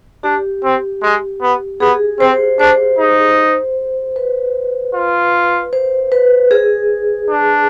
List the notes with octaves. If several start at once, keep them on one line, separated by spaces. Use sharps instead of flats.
D4 G4
C4
G#3
B3
B3 G#4
C4 C5
D4 C5
D#4
B4
F4
C5
B4
G#4
D4